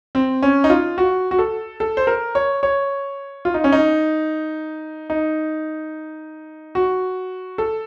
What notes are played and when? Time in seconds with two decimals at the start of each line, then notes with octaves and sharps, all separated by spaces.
0.15 C4
0.43 C#4
0.64 D#4
0.70 F4
0.98 F#4
1.31 F#4
1.39 A4
1.80 A4
1.97 C5
2.07 A#4
2.35 C#5
2.63 C#5
3.45 F4
3.54 D#4
3.64 C#4
3.72 D#4
5.10 D#4
6.75 F#4
7.58 A4